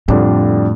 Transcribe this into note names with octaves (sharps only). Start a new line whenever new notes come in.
F2 A2 D3 G3 D4 F4